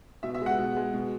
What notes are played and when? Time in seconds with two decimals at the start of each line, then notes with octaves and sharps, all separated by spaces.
0.23 B2 E5
0.34 E5
0.42 G#3 F#5
0.58 B2
0.76 G#3
0.94 B2